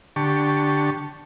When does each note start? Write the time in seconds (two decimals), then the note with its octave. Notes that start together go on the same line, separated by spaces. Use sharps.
0.16 D3 G4 A5 C#6